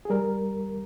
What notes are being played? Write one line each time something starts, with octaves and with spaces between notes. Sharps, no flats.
G#4
G3 A#4